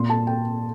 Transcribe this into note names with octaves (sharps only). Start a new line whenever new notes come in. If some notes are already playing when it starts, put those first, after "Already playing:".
Already playing: A#2 C6
A5
G5